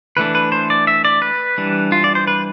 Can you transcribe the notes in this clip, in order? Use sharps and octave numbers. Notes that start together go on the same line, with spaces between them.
E3 A3 D4 B4
B4
C5
D5
E5
D5
B4
E3 G3 D4
F4
D5
C5
B4